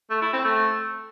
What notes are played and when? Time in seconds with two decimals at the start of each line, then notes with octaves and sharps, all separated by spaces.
0.10 A3
0.22 E4
0.33 C4
0.45 A3